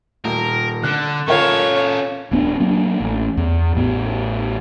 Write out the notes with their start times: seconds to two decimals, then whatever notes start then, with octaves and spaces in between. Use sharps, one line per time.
0.24 D#1 A#4
0.83 D3 F#6
1.28 C#4 F4 A4 A#4 C#5
2.31 D1 B3 D4
2.60 F#3 A#3 D4
3.00 A1
3.37 E2
3.75 A1 A2 B3